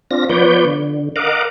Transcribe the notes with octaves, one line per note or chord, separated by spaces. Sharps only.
C4 D4 F4 A#6
F3 B3 B4 C#5 D5 G6
D3
A#4 D#5 F5 F#5 D6